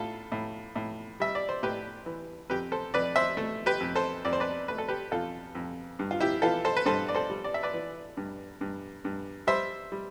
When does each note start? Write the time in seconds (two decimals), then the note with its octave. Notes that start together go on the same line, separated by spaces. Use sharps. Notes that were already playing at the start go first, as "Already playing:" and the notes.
Already playing: A2 F4 A4
0.32 A2
0.76 A2
1.20 G3 E5
1.35 D5
1.49 C5
1.63 A2 G4 B4
2.06 E3
2.50 F2 G4 B4
2.72 A4 C5
2.94 F2 B4 D5
3.16 C5 E5
3.37 A3
3.66 G4 B4
3.80 F2
3.96 A4 C5
4.25 F2 D5
4.33 C5
4.40 B4 D5
4.68 A3 B4
4.78 A4
4.88 G4 B4
5.11 F2 F4 A4
5.55 F2
5.99 G2
6.11 F4
6.20 E4 G4
6.42 E3 F4 A4
6.65 A4 C5
6.77 B4
6.85 G2 A4 C5
7.09 D5
7.15 A4 C5
7.30 G3
7.44 D5
7.54 E5
7.63 B4 D5
7.74 E3
8.17 G2
8.61 G2
9.05 G2
9.47 G3 C5 E5
9.92 G3